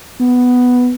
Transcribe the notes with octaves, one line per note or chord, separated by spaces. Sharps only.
B3